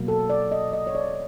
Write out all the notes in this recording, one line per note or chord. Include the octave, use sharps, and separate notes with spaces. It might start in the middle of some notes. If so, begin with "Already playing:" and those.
Already playing: B2 F#3 A#3
A4
D5
D#5
D#5
C#5
D5